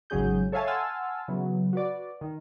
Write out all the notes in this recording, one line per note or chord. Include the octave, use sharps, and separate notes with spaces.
G#1 C#3 F#3 C#4 G#4 G6
A4 C#5 E5 F5 G#5 A5
F#5 G#5 A5 C6 E6 F6
C#3 E3 F#3 B3
F#4 B4 D5
D#3